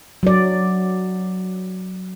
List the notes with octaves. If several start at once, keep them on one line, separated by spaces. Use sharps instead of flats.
F#3 D5